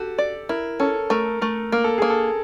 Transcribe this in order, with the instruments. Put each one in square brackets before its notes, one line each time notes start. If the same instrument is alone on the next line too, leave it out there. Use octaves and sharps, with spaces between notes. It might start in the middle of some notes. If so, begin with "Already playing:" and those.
Already playing: [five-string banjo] F#4 [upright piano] G4 A4
[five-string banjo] D5
[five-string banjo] E4 [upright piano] A#4
[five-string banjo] C#4 [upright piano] A4
[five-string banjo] A3 [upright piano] A#4
[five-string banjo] A3 [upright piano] A#4
[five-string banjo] A#3 [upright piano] A#4
[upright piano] A4
[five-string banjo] A#3 [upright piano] G#4
[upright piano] A4